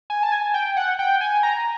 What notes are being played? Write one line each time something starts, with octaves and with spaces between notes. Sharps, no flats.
G#5
A5
G#5
G5
F#5
G5
G#5
A#5